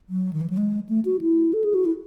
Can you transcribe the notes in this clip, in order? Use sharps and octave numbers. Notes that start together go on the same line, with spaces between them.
F#3
D#3
E3
F#3
G#3
A3
F#4
E4
A4
G#4
F#4
E4